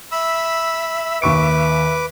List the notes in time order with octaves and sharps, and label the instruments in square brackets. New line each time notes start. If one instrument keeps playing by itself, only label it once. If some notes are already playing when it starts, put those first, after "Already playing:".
[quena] E5 [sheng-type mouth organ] B5 E6
[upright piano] D#2 C#6 D7 [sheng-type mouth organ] B4 D6